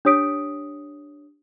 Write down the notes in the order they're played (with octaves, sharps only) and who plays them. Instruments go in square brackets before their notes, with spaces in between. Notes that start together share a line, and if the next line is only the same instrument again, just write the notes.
[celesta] D4 G4 C#5 D#6 B6 D7